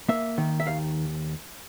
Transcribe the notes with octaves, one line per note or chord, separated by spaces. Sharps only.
A#3 E5
D#3
E5
D#2 F5